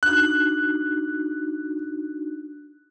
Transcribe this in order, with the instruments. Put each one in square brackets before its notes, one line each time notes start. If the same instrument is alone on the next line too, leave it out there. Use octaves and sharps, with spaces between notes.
[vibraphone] D4 D#4 F#4 [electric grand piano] F#6